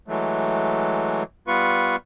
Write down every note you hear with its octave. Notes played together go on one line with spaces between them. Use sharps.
E3 F#3 G#3 A3
G3 B3 F4 B4 C#6